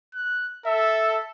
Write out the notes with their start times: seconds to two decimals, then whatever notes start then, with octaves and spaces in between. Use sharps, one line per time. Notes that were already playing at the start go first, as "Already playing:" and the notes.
0.15 F#6
0.66 A4 E5